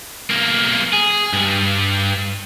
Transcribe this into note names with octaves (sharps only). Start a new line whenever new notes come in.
B1 A#3
G#4
G2